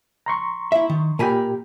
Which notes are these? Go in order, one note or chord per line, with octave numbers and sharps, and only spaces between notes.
A#5 C6 C#6
E4 E5
D#3
A#2 G4 A#4 G#5 B5